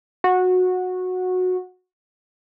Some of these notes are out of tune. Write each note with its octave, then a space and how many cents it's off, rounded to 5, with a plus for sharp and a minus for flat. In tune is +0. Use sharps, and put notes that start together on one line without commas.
F#4 -15